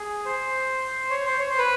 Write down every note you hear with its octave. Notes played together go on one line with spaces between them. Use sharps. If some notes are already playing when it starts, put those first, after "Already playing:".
Already playing: G#4
C5
C#5
C5
C#5
C5
B4